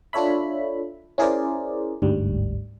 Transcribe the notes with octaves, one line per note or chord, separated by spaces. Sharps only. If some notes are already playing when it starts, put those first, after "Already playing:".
D4 F4 A4 C#5 E5 B5
C#4 E4 G#4 A#4 C5 D5
G1 D2 G#2 G3